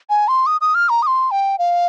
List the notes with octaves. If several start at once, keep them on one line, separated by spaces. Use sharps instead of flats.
G#5
C6
D#6
D#6
F6
A#5
D#6
C6
G5
F5